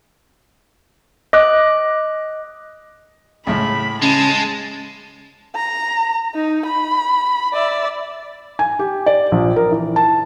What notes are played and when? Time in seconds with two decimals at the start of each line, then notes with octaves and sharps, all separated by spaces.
1.33 D#5 D6 F#6
3.47 C#2 A2 B5
4.02 C#3 G#3 A5
5.55 A#5
6.35 D#4
6.65 B5
7.53 D5 E5
8.59 G#5
8.79 G4
9.06 D5
9.32 A#1
9.56 A#4
9.72 E3
9.96 A5